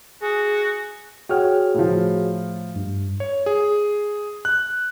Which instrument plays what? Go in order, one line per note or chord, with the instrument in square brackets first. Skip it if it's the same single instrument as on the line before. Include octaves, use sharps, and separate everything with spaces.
[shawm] F#4 [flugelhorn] G#4
[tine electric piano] F#4 G#4 C#5 [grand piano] F#5 G5 F6
[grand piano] A2 F3
[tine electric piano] G2
[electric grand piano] C#5
G#4
F#6